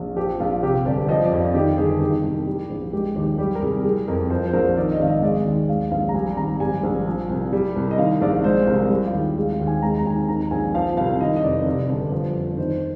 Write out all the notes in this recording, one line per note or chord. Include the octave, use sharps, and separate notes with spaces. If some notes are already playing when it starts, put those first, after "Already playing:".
Already playing: A#1
F3 G4
A#1 F4
C3 G4
G1 D5
F3 D#5
D5
F2
F4
D#3 G4
G1 G#4
D#3 G4
C2
G3
A#1
G#3 G4
D#2 G4
G3 G4
A#4
C2 G#4
G3 G#4
F2 A#4
F3 C5
C5
A#1 A#4
D#3 D5
D#5
G#1 F5
D#5
G#3 D5
D#2
G#3 F5
A#1 F5
A#5
G3 G#5
G#1 A#5
G3 G#5
A#1
F3
C2
G3
C2
D#5
D#3 F5
A#1 D5
G#3 C5
C2 A#4
A#4
G3 G#4
F4
D#2
G#3 G#4
F5
D#2
G#5
G#3 A#5
A#5
D#2 G#5
D#3 A#5
A#1 G#5
F3 F5
C2 F5
D#3 D#5
D#5
F1 D5
C3
G1
F3
F2
D#3 C5